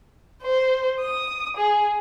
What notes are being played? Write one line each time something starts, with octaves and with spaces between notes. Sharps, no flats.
C5
D#6
G#4